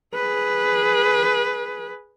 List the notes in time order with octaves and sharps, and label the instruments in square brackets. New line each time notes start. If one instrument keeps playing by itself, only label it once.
[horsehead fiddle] G#4 B4